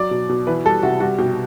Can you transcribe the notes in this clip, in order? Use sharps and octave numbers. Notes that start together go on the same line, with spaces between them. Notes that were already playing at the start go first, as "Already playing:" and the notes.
Already playing: F#3 D5
B2
B2
E3 B4
G3 A4
C3 F#4
G3 F#4
B2 G4